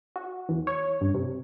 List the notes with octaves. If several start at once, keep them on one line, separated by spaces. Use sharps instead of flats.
F#4
E2
C#5
G2
C3